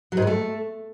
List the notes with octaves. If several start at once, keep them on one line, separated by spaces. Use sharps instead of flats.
F#3
G#2
G3
A3